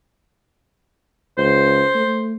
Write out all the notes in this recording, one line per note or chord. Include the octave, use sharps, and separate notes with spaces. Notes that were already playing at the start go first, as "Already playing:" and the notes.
C#2 C5
A3